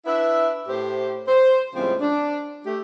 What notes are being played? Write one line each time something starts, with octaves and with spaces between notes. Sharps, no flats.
D4 E4 B4 E5
A2 G4 C5
C5
A2 C#3 F3 G3 G#3 C4
D4
A3 G4